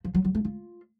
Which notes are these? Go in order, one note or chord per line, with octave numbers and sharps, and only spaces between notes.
F3
F#3
F#3
A3
F4